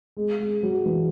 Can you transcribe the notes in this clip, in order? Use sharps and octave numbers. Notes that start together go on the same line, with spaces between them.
G#3
G#3
F#3
E3